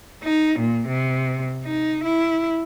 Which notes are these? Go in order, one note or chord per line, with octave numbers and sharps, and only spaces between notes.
D#4
A#2
C3
D#4
E4